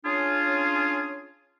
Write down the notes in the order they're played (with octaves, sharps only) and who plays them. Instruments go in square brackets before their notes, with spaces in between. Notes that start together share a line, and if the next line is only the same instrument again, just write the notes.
[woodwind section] C#4 D4 F4 G#4